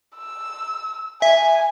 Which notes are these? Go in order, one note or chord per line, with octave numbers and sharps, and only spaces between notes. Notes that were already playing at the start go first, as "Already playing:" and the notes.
E6
E5 G#5